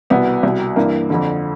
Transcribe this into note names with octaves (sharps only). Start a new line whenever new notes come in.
C2 B2 B3
C2 B2
G2 E3 A#3
F2 D3